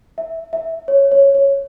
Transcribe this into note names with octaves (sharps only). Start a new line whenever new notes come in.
E5
E5
C#5
C#5
C#5